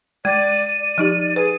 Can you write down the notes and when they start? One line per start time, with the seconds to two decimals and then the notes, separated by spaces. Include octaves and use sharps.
0.25 G#3 D5 D#7
0.79 D5
0.98 F3 D#4 G4
1.36 G#4 B4